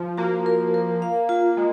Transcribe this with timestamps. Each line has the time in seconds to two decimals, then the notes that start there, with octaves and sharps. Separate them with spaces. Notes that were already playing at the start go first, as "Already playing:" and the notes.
Already playing: F3
0.18 A#3 F#4
0.46 A#4
0.74 A#4
1.02 F5
1.29 F4
1.57 G#3